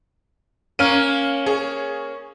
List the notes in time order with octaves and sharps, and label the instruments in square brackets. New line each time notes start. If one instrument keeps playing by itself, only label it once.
[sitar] A#3 C#4 [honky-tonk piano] F6 D#7
[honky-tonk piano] G#4 C#5